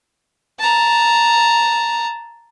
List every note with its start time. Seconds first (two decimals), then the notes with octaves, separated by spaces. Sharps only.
0.59 A5 A#5